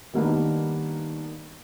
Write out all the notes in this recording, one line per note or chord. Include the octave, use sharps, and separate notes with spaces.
D#3 G3 A#3 B3 D4 D#4